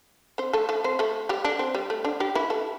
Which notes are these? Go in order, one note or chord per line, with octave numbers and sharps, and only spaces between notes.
C4 C5
A3 A4
A3 A4
C4 C5
A3 A4
G3 G4
D3 D4
C4
G3
A3
D3 D4
G3 G4
E3 E4
A3 A4